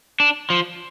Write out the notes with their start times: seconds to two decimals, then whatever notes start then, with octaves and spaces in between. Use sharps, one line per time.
0.20 D4
0.50 F3